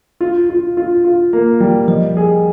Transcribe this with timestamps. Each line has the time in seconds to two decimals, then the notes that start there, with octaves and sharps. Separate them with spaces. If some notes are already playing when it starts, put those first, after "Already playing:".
0.21 F4
0.50 F4
0.77 F4
1.04 F4
1.33 A#3
1.60 G3
1.88 F3 D#5
2.17 G#4